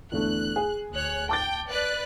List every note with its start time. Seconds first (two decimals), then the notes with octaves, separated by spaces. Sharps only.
0.12 E2 D3 A3 F#6
0.56 G#4
0.91 D2 C#5 F#6
1.29 G5 A5 D6 A6
1.69 B4 D5 F#6